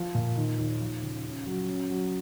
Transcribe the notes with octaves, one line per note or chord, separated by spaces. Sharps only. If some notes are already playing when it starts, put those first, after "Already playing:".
Already playing: F3
A#2
D#3
D#2
F3
C#3
C#4
F#3
C#4
F#3